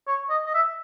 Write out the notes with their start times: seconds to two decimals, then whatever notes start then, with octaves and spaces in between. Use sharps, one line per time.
0.08 C#5
0.30 D#5
0.46 D#5
0.54 E5